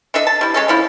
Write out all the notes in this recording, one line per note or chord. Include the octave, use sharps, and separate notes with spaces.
D4 A4 D#5 E5
A5
G3 E4
G#3 C#4 A4
D3 F3 E4